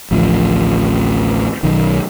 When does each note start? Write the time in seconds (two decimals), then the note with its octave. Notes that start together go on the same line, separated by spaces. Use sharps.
0.11 A1 D2 F3
1.63 B1 D#3